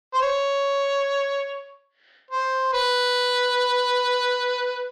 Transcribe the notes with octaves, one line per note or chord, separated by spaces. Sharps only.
C5
C#5
C5
B4